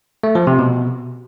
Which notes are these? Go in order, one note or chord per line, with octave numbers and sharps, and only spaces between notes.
A3
F3
C3
B2